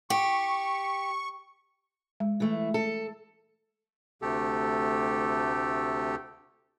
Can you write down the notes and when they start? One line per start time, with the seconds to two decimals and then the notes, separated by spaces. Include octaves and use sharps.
0.10 G4 C#6
2.20 G#3
2.40 E3 A3
2.74 A4
4.22 D2 C3 A3 G4 A4